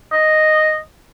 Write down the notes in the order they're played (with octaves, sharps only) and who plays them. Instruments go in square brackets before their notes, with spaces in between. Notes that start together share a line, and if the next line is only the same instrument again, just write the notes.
[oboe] D#5